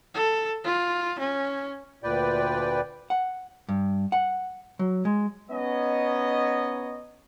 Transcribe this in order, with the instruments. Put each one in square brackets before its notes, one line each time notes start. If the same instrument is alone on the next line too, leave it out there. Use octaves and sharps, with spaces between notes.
[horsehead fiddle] A4
F4
C#4
[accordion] D2 A#2 B4 D5 G5
[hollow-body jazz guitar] F#5
G2
F#5
F#3
G#3
[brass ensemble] B3 C#4 D#4 C#5 D#5